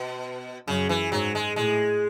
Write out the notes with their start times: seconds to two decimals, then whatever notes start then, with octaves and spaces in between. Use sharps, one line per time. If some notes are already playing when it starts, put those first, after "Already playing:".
Already playing: B2
0.68 F#2 C#3
0.89 E3
1.12 G#2 F#3
1.35 G#3
1.56 A2 G#3